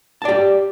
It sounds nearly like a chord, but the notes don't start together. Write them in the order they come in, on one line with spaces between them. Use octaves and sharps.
A5 D5 G4